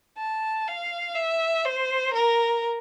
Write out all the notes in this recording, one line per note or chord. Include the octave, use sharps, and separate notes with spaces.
A5
F5
E5
C5
A#4